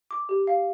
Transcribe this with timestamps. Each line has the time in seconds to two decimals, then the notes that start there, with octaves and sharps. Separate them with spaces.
0.11 D6
0.29 G4
0.47 F5